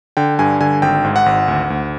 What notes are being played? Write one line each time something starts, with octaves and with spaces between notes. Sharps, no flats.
D3 G5
G2 G#5
D3 G#5
G#1 G5
G#2
F#5
G#1
D2
D2